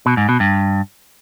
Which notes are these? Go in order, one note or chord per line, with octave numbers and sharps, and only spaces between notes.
B2
G#2
B2
G2